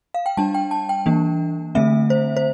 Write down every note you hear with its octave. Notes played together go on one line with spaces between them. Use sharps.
F5
G5
G3 D4 A5
G5
A5
G5
E3 A#3 D4
D3 A3 C4 E5
C5
C5